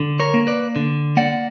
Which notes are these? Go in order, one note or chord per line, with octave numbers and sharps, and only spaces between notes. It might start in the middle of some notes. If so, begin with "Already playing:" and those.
Already playing: D3
A#4 C#5
A#3
B4 D5
D3
A#3 D5 F#5